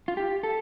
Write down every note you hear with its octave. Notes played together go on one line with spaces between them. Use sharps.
F4
G4
A4